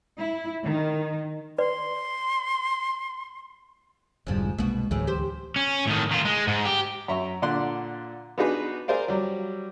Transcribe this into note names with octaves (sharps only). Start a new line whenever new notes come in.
E4
D#3
B4 D5 C6
F1 D2 G#2 F3 G3
C2 B2 G#3 A#3 F#4
D2 A2 C#3 E3 F#3
G4 C5
C#4
A2 D#3
D#3 F4
G#3
G#2
G4
F#2 E5 A#5 C#6
A#2 D3 F#5 C6 F#6
B3 D4 D#4 F#4 G#4 B4
G#4 A#4 C5 D5 F5
F#3 G3